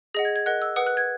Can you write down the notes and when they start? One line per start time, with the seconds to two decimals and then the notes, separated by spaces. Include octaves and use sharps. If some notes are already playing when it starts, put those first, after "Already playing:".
0.15 G#4 D#5 F#5 A#6
0.25 G#6
0.36 G#6
0.46 A#4 D#5 F#5 F#6
0.62 E6
0.76 B4 F#5 D#6
0.86 F#6
0.97 G#6